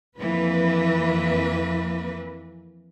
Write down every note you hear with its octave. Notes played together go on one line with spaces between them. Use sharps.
F2 E3 A#3 B4